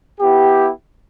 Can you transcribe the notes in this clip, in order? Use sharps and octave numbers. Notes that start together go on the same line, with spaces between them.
B3 E4 G4